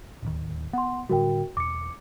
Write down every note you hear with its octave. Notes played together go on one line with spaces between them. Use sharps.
D1 D#2
B3 F#5 C6
A2 D3 G3 F#4 A#4 G5
E1 D6 C#7